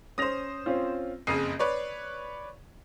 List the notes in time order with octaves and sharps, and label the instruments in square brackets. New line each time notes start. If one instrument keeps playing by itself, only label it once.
[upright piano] C#4 A#6 F7 [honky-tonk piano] C5 D#6
[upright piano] C4 C#4 F4
[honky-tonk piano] F#1 F2 C#3 [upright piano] D#6 C7 D#7
[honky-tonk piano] B4 C#5 D5